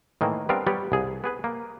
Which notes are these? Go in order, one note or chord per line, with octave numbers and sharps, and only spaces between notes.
A2 D#3 E3 A#3
G3 B3 C4 D4 A#4 F5
G3 B3 G4 C#5 D5
C2 G#4
B3 G#4 B4
A#3